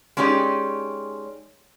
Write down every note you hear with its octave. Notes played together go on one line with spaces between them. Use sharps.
G#3 C#4 D#4 G4 D5